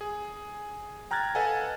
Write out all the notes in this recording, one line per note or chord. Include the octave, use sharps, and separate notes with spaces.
G#4
G5 A#5 F6 F#6 G#6 A6
A4 B4 D#5 F5 F#5 G#5